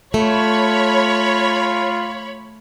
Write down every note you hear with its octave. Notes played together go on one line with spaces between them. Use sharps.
A3 F4 C#5 B5